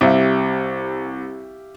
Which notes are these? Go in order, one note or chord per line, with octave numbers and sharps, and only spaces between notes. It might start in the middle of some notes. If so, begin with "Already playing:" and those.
C2 G4 E5 F5